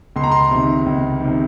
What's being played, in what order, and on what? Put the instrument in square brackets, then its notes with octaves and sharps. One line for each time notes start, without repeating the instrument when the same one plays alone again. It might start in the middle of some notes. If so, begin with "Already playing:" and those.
[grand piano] C#2 C6
A#5
C6
C3 D#3
C#2
C3 D#3